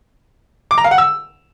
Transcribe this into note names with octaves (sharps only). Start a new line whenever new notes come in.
D6
A#5
F5
F#5
E6